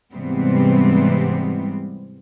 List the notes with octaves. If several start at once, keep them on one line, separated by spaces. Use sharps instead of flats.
G#2 C3 E3 G3 B3 C4